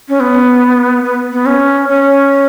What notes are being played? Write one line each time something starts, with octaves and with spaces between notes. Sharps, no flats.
C#4
B3
B3
B3
C#4
C#4